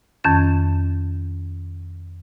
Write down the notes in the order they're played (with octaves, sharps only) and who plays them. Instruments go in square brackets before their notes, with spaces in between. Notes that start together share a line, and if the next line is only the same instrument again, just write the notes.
[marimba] F2 D#3 C#4 A6